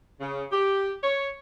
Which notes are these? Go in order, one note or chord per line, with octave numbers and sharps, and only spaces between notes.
C#3
G4
C#5